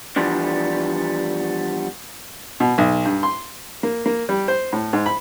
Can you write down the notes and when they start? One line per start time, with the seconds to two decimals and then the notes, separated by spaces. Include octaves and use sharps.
0.16 E3 F3 G3 B3 D4
2.60 B2
2.78 B1
3.05 G2
3.23 C6
3.83 A#3
4.06 A#3
4.29 G3
4.48 C5
4.73 A2
4.93 G#2
5.06 B5